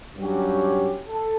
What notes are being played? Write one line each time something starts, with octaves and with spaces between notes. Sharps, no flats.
G2 F#3 C#4 G4
A4